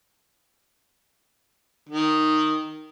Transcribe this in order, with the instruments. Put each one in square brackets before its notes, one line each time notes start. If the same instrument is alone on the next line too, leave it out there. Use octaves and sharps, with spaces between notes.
[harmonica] D#3